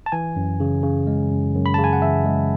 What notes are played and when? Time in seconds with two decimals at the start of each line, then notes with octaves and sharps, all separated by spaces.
0.06 A5
0.12 E3 G#5
0.36 F#2
0.60 C#3
0.83 C#3
1.07 G#3
1.31 F#2
1.55 F#2
1.66 B5
1.74 C#3 A5
1.84 G#5
1.93 F#5
2.02 E3 E5
2.26 G#3